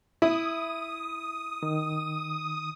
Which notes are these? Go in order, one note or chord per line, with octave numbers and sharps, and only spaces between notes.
E4 D#6
D#3